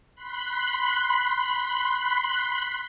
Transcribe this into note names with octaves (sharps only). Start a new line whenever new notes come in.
B5 C6 F#6